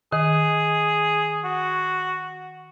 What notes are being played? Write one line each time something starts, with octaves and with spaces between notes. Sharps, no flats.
D#3 G#4
F#4